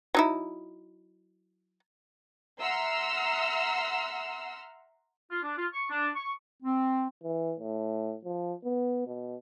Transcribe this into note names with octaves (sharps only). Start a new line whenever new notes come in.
F#3 D#4 E4
E5 F#5 A#5 C6 E6 F6
F4
D4
F4
C#6
D4
C#6
C4
E3
A2
F3
B3
B2